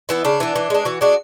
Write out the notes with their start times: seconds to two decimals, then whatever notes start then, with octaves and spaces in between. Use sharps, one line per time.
0.09 E3 B3 E4
0.25 C#3 D4
0.40 E3 B3
0.56 E3
0.70 G#3 D4
0.85 E3 F#4
1.01 G#3 D4 F#4